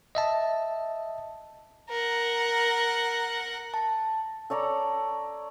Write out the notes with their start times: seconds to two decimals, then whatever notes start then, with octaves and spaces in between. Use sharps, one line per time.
0.15 D#5 E5 A5
1.90 A#4 F#5
3.74 A5
4.50 A4 C#5 D5 A#5